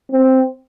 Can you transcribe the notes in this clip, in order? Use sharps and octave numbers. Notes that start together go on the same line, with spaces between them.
C4